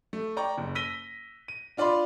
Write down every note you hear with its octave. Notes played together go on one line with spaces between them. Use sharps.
A3
D5 G5 A#5 C#6
F#1
E6 A#6 B6 D#7 G7
D#7
D4 F4 D5 B5 C6